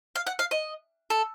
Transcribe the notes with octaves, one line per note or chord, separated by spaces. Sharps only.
F5
F#5
F5
D#5
A4